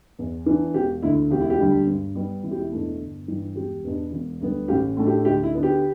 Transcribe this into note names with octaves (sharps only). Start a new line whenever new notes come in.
E2
E3 B3 D4
E1 G4
D2 D3 E4
E1 G4
E4
G4
D2 D3 G3 D4
G2
G3 B3
E1 E4
G4
E4
E2 B2 A3 D4
G1
G2 E3 G3
E1 G4
E2 B2 B3 D4
E1
D2 D3 G3 B3
A1 G4
A2 A3 D4
G4
D2 G4
E4
D3 B3 D4
G4